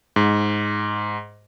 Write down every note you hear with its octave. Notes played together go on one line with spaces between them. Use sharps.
G#2